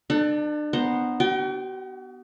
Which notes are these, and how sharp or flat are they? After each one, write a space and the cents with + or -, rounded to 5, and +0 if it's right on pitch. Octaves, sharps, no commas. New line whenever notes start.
D4 +35 A4 +0
B3 +0 C5 +0 A#5 +0
F#4 +45 G5 +0